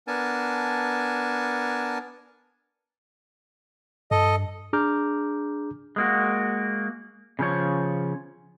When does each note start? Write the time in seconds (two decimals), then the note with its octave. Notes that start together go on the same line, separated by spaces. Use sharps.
0.07 B3 D4 A#4 G#5 A5
4.11 G2 A4 D#5
4.73 D4 G#4 A#5 D6 F6 G6
5.96 G#3 A#3 F#4
7.39 C#3 F3 C#5